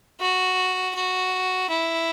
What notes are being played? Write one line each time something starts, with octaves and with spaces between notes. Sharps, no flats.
F#4
F#4
E4